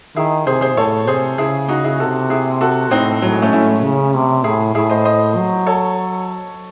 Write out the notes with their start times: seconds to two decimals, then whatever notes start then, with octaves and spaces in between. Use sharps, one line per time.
0.16 D#3 E4 G#4
0.47 C3 G#4 C5
0.61 G#4 C5
0.77 A2 A4 C#5
1.07 C3 G#4 C5
1.38 C#3 E4 G#4
1.68 D#4 F#4
1.84 E4 G#4
2.00 C3 F#4 A4
2.30 E4 G#4
2.61 F#4 A4
2.91 A2 C4 D#4
3.22 A2 F#3
3.32 G#3
3.42 A3 C#4
3.52 A2 C#4 E4
3.83 C#3
4.14 C3
4.44 A2 E4 G#4
4.74 A2 E4 G#4
4.90 C5 D#5
5.05 C5 D#5
5.37 F#3
5.67 A4 C#5